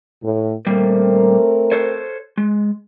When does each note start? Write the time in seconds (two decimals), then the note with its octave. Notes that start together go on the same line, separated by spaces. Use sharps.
0.24 A2
0.67 A#2 G3 A3 A#3 C4 A#4
1.72 A4 C5 C#5
2.38 G#3